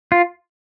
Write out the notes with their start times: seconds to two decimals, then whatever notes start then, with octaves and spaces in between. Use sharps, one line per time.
0.12 F4